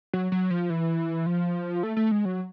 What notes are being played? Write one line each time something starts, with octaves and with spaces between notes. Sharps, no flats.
F#3
F#3
F3
E3
F3
A3
A3
G#3
F#3